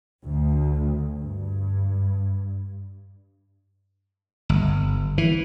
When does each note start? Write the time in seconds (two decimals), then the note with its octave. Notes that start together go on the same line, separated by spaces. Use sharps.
0.24 D2
1.19 G2
4.49 G1
5.18 E3